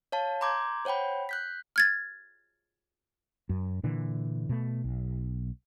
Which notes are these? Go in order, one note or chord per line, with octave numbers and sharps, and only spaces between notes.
C#5 F5 A5
A#5 C6 D6 G6 G#6
C5 C#5 F#5 G5 B5
F#6 G6 B6
F6 G#6 A6
F#2
A#2 D3 E3
B2 A3
B1